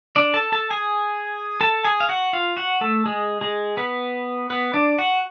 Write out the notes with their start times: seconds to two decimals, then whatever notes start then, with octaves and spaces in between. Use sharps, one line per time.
0.16 D4 D5
0.34 A4 A5
0.52 A4 A5
0.70 G#4 G#5
1.61 A4 A5
1.85 G#4 G#5
2.00 F5
2.09 F#4 F#5
2.33 F4 F5
2.57 F#4 F#5
2.81 A3 A4
3.06 G#3 G#4
3.41 G#3 G#4
3.77 B3 B4
4.50 B3 B4
4.74 D4 D5
4.98 F#4 F#5